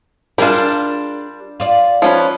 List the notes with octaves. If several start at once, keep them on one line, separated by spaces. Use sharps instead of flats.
G3 D4 F4 G#4 A#4
F4 D5
F3 C#4 B4